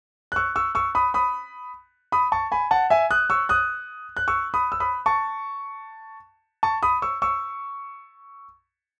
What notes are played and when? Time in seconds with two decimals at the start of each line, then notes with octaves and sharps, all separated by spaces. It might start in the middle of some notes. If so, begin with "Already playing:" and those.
0.32 F#6
0.36 C#6 E6
0.56 C#6 E6
0.75 C#6 E6
0.95 B5 D#6
1.14 B5 D#6
2.12 B5 D#6
2.32 A5 C#6
2.52 G#5 B5
2.71 F#5 A5
2.90 E5 G#5
3.11 D#6 F#6
3.30 C#6 E6
3.49 D#6 F#6
4.17 F#6
4.28 C#6 E6
4.54 B5 D#6
4.72 E6
4.80 B5 D#6
5.06 A5 C#6
6.63 A5 C#6
6.83 B5 D#6
7.02 C#6 E6
7.22 C#6 E6